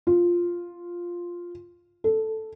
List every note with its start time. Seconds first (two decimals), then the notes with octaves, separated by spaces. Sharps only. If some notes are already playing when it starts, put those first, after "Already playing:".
0.07 F4
2.04 A4